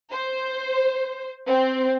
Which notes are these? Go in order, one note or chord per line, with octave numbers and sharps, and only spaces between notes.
C5
C4